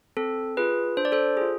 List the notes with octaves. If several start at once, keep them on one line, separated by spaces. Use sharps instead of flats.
C4 A4
F4 G#4 B4
D4 C5
D5
A4 C5
F4 G#4